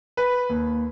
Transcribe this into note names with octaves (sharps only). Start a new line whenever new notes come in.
B4
D#2